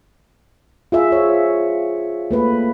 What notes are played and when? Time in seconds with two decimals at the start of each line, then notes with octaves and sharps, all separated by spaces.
0.92 F4 G#4 E5
1.12 C5 C#5
2.31 A3 A#3 B4